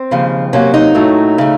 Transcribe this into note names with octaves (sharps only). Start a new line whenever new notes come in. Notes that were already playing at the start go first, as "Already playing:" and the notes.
Already playing: C4
D#2 C#3 F3
C3 F#3 A#3 C#4
D#4
A2 F#3 A3
C#3 A3